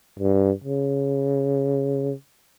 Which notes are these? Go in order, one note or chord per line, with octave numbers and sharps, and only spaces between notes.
G2
C#3